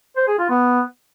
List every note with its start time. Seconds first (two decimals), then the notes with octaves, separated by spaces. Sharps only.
0.17 C5
0.28 G#4
0.39 F4
0.50 B3